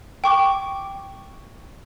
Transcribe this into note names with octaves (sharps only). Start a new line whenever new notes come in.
G5 C#6 D6